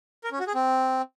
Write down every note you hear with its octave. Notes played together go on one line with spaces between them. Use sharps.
A#4
C#4
F#4
G#4
C4